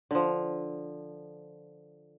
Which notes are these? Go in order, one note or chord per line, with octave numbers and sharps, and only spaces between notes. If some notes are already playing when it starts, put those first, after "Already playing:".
D3 F3